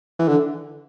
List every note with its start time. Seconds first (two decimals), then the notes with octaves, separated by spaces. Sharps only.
0.19 E3
0.28 D3